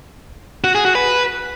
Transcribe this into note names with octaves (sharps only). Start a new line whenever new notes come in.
F#4
G#4
F#4
B4